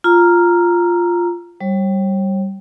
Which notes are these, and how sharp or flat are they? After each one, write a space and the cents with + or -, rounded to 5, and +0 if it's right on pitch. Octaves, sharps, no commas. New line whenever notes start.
F4 +0 A#5 +0 E6 +35
G3 -15 C#5 -40